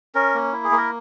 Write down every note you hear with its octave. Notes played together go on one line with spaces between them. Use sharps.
C#4 A#4
A#3
E4
G#4
A#3
A#4